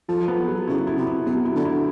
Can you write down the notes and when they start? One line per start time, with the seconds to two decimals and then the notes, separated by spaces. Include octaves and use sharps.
0.08 F3 A4
0.28 B3
0.48 F#3
0.67 C#3 E4
0.87 E4
0.97 C3
1.06 E4
1.26 B2 F#3
1.45 E4
1.55 D3
1.65 E4